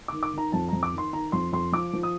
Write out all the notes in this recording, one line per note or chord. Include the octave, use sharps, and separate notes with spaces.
D#3 D6
D6
D#3 A#5
F2 A5
F2 A#5
D6
D#3
C6
D#3 A#5
F2 C6
F2 C6
F3 D6
F3
D#6